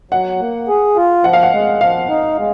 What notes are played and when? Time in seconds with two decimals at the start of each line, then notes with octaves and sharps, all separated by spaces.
0.11 F#3 F#5
0.40 A#3
0.68 G#4
0.96 F4
1.24 F3 F#5
1.33 F5
1.43 F#5
1.53 G#3
1.80 F3 F5
2.09 D#4
2.37 G#3